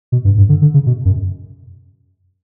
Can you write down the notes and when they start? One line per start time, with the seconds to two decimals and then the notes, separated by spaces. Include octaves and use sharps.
0.12 B2
0.25 G2
0.37 G2
0.49 D3
0.62 D3
0.74 C#3
0.86 B2
1.05 F#2